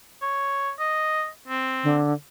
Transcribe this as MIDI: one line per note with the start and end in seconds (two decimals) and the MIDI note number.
0.22 0.71 73
0.80 1.27 75
1.48 1.97 60
1.84 2.13 50